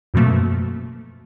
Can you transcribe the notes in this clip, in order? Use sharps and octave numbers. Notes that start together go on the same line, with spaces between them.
F#2 B2 F3 A3 A#3